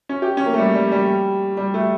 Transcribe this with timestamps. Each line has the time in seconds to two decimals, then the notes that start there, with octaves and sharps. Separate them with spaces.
0.09 C#4
0.22 G4
0.37 C#4
0.46 A#3
0.54 A3
0.58 G3
0.75 G3
0.92 G3
1.57 G3
1.74 A3